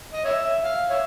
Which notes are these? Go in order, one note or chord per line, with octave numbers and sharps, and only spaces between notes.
D#5
C#5 E5
F5
C#5 E5